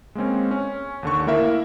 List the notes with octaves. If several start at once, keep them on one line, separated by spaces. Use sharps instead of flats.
G#3 A#3 C4 C#4
C#4
D#2 D3 C#6
A3 A#3 E4 A#4 E5 F5